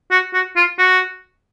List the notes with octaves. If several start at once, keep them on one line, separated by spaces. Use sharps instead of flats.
F#4
F#4
F4
F#4